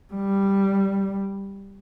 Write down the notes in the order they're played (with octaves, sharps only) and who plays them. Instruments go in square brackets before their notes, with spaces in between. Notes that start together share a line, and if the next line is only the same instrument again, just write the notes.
[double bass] G3